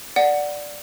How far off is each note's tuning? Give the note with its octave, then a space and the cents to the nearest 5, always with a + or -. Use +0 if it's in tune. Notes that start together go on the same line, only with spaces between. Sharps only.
D5 +0 F#5 +0